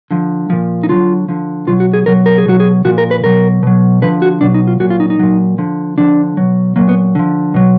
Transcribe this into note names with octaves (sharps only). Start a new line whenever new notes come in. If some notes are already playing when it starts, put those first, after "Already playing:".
D3 F3
A#2 F3
D#4
D3 F#3 F4
D3 F3
B2 F#3 F4
F#4
G#4
B2 F#3 A#4
A#4
G#4
B2 F#3 F#4
G#4
A#2 F3 F#4
A#4
B4
B2 F#3 A#4
B2 F#3
D3 F3 B4
F#4
B2 F#3 D4
D#4
F4
A#2 F#3 F#4
F4
D#4
D#4
A#2 F#3
D3 F3
D3 F3 D4
B2 F#3
A#2 F#3 A#3
B3
D3 F3
B2 F#3